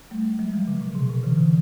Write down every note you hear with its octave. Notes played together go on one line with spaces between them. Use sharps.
G3 A3
F#3 G#3
F3 G3
C#3
C3
B2
C3
D3 E3
D3 E3